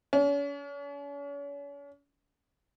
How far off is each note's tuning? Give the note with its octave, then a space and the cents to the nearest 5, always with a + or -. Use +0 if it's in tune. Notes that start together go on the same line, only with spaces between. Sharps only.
C#4 +40